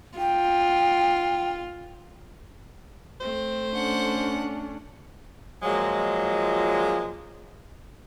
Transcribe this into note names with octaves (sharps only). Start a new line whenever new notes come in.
F4 G5
A3 C4 C5
C#4 D4 F#5
A#2 F3 F#3 G#3